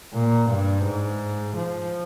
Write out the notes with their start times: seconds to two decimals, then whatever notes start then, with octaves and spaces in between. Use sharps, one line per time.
0.14 A#2
0.49 G2
0.85 G#2
1.56 F3